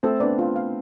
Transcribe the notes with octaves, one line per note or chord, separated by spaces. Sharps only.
A3 C4 A4
B3 D4 D5
F4
F5